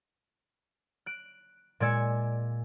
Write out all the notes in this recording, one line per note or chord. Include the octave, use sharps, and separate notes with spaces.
F#6 D7
A#2 G#3 D5 G#5 E6 C#7